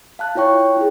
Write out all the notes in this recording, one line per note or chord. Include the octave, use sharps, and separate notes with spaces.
F5 A5 F#6
E4 F4 C#5 G5 C#6
E4 G#4